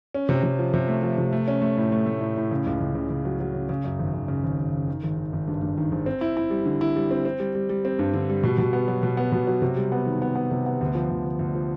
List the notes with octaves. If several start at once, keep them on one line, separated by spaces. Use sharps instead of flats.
C#4
C3
C3
F3
C3
A3
F3
C3
A3
C#4
A3
A2
A3
A3
A2
A2
C#3
C#2
C#2
C#3
C#3
F#3
F#3
C#3
C#3
F#2
G#1
G#1
C#3
G#1
G#1
C#3
D#3
G#1
D#3
G#1
G2
G2
D#3
G#1
C4
E4
E4
G3
D3
E4
G3
C4
C4
G3
G3
G3
C4
G2
D3
G3
B2
B2
B3
F#3
B2
B3
B2
F#3
C3
G3
B3
D#3
B3
B3
C3
B3
D2
F3
D2
D2
D2
F3